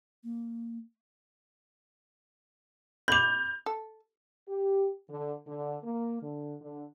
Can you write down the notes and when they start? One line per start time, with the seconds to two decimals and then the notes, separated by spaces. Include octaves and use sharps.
0.24 A#3
3.08 B5 D6 G6 F7
3.66 A4
4.48 G4
5.10 D3
5.46 D3
5.83 A#3
6.22 D3
6.60 D3